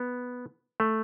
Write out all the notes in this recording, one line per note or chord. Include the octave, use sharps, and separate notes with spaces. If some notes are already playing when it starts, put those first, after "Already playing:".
Already playing: B3
A3